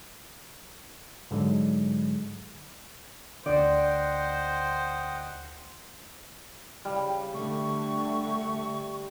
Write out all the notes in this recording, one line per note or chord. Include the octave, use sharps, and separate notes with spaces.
G#2 D3 F#3 G#3
D2 D3 C5 D5 D#5 F#5 G5
C#3 G3
D3 A3 C#6